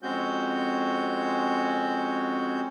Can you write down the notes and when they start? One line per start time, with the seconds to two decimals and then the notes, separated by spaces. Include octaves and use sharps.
0.03 F2 G#3 C4 C#4 F#4 G6